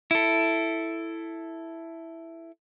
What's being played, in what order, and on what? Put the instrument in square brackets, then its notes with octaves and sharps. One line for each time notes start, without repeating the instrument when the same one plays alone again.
[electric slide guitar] E4 A4